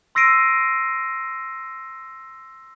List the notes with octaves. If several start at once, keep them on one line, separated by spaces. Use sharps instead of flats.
C6 E6 A#6 C7 D7 D#7